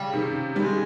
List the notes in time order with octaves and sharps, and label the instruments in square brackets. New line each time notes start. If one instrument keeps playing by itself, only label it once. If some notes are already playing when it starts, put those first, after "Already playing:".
Already playing: [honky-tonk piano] C#3 [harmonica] G3
[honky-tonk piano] C3 D#3
[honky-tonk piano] D#3 G3 [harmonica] G#3